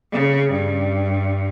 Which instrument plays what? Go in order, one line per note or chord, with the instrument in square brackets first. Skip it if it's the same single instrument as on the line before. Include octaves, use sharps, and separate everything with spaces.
[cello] C#3
G2